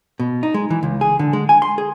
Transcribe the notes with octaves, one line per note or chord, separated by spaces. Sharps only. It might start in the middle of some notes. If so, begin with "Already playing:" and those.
B2
D#4
G#3
E3
C#2
G#4
D3
G#3
G#5
C6
G#4